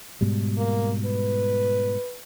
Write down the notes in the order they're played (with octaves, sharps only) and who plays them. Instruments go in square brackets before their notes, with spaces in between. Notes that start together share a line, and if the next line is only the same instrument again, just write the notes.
[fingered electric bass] G#2 B2 G3
[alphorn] A#3
B4